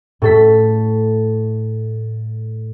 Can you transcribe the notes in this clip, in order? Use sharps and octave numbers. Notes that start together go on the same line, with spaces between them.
A2 A4 B6